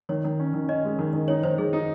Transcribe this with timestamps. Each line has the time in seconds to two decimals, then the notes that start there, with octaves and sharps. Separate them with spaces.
0.09 D#3 C#5
0.24 D#3
0.40 C#4
0.54 D#3
0.69 C#4 D#5
0.84 G#3
0.99 D#3
1.13 D#3
1.28 D#4 C#5
1.43 D#3 C5
1.58 D#3 G#4
1.73 D#4